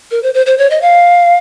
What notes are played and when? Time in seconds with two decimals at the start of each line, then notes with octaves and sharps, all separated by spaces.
0.11 A#4
0.23 C5
0.34 C5
0.46 C5
0.58 C#5
0.70 D#5
0.82 F5